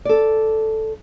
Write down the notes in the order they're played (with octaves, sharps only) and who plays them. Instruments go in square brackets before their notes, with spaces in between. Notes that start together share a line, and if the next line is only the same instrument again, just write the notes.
[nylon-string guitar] A4 D5